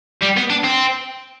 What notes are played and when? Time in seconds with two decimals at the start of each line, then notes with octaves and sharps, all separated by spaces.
0.22 G3
0.37 B3
0.50 D4
0.64 C4